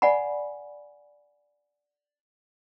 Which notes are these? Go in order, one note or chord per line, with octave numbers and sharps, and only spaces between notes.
D5 F#5 G#5 B5